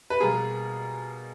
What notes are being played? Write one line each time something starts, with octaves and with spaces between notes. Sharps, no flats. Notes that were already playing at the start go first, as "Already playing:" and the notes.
B4
B2 G3 A#3 G#4 A#4